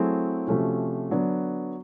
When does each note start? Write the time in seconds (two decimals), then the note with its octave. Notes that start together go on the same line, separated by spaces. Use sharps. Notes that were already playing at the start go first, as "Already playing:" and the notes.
Already playing: F#3 A3 C4 E4 G#4
0.47 C3 F3 A3 C#4 F#4
1.10 D3 F#3 B3 D4